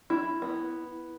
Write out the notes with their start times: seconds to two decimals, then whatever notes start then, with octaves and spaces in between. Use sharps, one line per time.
0.10 E4
0.42 B3